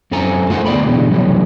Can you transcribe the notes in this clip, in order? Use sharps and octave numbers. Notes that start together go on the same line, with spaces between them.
F#2 C4 A4 G#5 A#5
A3 F4 A4 A#4 C5 F#5
D2 B3 G#4 D5 G5 B5
B2 D3 E3 G3
C3 E3 F#3 G3 A3